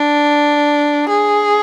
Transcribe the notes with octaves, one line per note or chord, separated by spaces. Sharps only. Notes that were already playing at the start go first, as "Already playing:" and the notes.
Already playing: D4
G#4